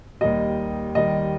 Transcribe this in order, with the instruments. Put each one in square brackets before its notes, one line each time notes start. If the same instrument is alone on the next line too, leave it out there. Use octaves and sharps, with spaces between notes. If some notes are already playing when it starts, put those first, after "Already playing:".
[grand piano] D#2 D#3 G3 [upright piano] D#5
[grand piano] D#2 D#3 G3 [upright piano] D#5